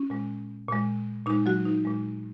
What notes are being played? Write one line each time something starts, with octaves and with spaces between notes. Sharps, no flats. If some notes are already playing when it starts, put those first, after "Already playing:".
Already playing: C#4
A#2 G#3
A#2 G#3
A#2 G#3 D#4
F#3 F#4
D#4
A#2 G#3